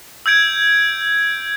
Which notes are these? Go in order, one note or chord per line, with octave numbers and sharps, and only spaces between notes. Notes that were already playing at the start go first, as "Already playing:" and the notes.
E6 G6 G#6 D7